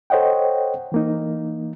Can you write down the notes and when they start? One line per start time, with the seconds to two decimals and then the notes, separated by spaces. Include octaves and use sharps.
0.10 A4 C5 C#5 D#5 F#5 G5
0.92 E3 A#3 D#4